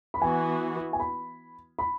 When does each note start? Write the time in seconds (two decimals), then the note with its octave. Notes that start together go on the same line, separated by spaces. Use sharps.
0.14 B5
0.21 E3 B3 F#4 G#5
0.93 G#5
1.00 B5
1.79 B5